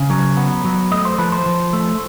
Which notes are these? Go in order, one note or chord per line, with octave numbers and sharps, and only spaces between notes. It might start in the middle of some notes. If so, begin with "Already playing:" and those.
Already playing: C#3
F#3
B3
F#3
A3 D#5
C5
F3 B4
C5
F3
A3